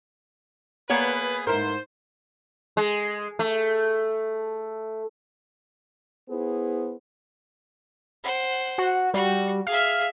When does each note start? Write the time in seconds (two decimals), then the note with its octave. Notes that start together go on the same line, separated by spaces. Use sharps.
0.90 A#3 B3 G#4 B4 C#5
1.47 G#2 E4 A#4 C5
2.77 G#3
3.39 A3
6.30 B3 E4 G#4 C5
8.24 C5 F#5
8.78 F#4
9.14 G3 F#4
9.67 G#4 E5 F5